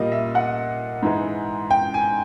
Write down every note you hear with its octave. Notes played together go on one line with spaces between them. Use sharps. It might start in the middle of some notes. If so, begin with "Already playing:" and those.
Already playing: A#2 G3 A#3 D#5
E5
F#5
G#2 E3 G#3
G5
G#5